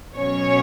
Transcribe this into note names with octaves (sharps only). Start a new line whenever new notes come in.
B2 F#3 C#4 C#5